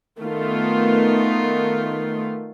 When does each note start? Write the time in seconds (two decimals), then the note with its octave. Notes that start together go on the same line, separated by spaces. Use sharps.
0.19 D#3 A3 B3 F4